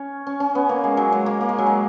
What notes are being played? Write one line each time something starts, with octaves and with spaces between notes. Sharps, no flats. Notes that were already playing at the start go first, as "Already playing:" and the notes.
Already playing: C#4
C#4
C#4
B3
A#3
G#3
F#3
G#3
A#3
A#3
G#3
F#3
G#3